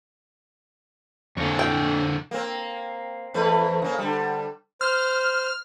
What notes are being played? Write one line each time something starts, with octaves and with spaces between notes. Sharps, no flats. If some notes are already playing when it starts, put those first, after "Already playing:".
F2 D3 D4 C#5
G5
A#3 C4
E2 A3 B4
C#3 A#3
D3 G3
C5 F6